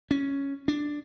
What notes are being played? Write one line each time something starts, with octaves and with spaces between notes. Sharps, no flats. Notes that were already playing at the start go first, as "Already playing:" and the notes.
C#4
D4